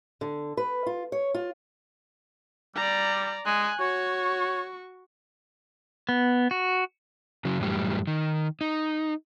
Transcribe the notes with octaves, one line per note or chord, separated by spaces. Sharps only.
D3
B4
F4
C#5
F4
G3 D5 A#5
G#3 G#5 F#6
F#4 C#5 C#6
B3
F#4
C#3 F#3
F#2 A2 E3 G3
D#3
D#4